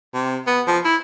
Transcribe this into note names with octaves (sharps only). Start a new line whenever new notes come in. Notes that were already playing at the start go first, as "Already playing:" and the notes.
C3
B3
F3
E4